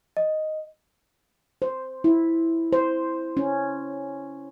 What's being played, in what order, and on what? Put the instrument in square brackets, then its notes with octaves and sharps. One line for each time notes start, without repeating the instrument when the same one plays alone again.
[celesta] D#5
[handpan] C5
E4
C5
C#4